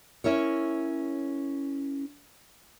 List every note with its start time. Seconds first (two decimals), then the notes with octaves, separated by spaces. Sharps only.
0.24 C#4 E4 A#4 C#5